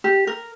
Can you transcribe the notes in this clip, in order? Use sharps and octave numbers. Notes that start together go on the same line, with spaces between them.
G4
A#4